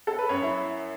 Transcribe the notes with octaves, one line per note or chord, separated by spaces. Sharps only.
A4
B4
F#2 C#5
E4